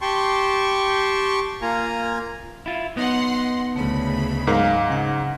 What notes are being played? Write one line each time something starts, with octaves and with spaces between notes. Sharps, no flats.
G4 G5 A5 C6 C#6
A#3 F4 G#5 A#5
E4 F4
B3 D#4 F#5 C6
D2 C#3 A3 B5
G#2 F#3 G#3 A#4 F5
C#3 D#4 F#5